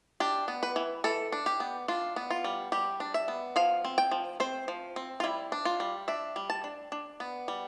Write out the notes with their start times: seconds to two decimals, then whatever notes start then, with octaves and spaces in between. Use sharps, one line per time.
0.20 D4 G4
0.48 B3
0.63 B4
0.76 E3
1.04 E3 A4
1.32 D4
1.46 G4
1.60 B3
1.88 D4 F4
2.16 B3
2.31 F4
2.44 G3
2.72 G3 G4
3.00 D4
3.14 E5
3.28 B3
3.56 F3 F5
3.85 C4
3.98 G5
4.11 F3
4.40 C4 C5
4.68 F3
4.96 C4
5.20 F4
5.24 G3 E4
5.52 D4
5.65 F4
5.80 G3
6.08 D4 E5
6.36 G3
6.50 A5
6.64 D4
6.92 D4
7.20 B3
7.48 G3